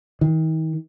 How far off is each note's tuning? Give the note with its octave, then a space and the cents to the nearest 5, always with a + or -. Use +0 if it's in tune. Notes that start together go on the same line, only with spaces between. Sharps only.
D#3 +40